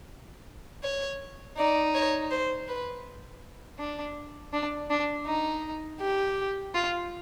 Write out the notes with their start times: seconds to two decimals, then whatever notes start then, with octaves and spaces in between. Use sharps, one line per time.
0.83 C#5
1.57 D#4 D5
1.94 C#5
2.31 C5
2.68 B4
3.79 D4
4.53 D4
4.90 D4
5.26 D#4
6.00 G4
6.75 F4